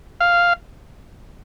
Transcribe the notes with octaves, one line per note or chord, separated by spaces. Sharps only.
F5